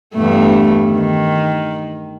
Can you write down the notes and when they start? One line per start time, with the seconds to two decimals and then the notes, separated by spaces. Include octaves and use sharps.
0.14 E2 G2 A3
0.92 D#3